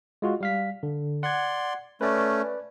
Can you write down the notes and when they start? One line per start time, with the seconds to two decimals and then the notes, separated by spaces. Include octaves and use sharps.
0.22 G#3 F4 F#4
0.41 G3 F5 B6
0.83 D3
1.23 D5 F#5 C6 G#6
2.01 A3 C#4 B4 D5